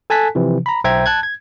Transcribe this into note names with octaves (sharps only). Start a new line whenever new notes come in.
A4 G#5 A5 F#6 B6
C3 E3 F3
A#5 B5
B1 C5 E5 G5 A#5 G#6
A5 F#6 G#6
G#6